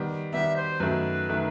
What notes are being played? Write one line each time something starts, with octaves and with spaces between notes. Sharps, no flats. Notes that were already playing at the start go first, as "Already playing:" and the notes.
Already playing: D#3 G3 B3
D#3 G3 B3 E5
C5
F#2 D#3 A3 D#4 B4
D#3 A3 D#4